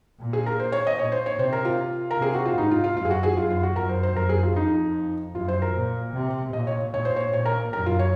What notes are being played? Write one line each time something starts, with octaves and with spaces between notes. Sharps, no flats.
A#2
G#4
A#4
C5
C#5
D#5
A#2 C#5
C5
C#5
C3 C5
A#4
F4
A#4
C3 G#4
F#4
F4
G#2 D#4
F4
F4
F#2 F4
G#4
F#4
G#4
F#2 F4
F4
F#4
F#2 A#4
C5
C5
F#2 A#4
G#4
F4
F2 D#4
F#2 F4
C5
A#4
A#2
C3
A#2 D#5
C#5
A#2 C#5
C5
C#5
A#2 C#5
A#4
F#2 A#4
F4
C#5